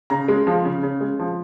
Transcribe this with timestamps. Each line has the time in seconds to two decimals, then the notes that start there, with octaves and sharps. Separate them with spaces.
0.10 C#3 A#5
0.28 G#3
0.47 F3
0.65 C#3
0.83 C#3
1.01 G#3
1.19 F3